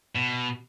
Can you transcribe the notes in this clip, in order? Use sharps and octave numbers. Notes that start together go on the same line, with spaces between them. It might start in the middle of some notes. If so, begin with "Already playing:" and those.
B2